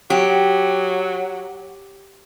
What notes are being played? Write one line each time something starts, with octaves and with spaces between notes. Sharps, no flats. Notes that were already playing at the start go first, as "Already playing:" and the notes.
F#3 G4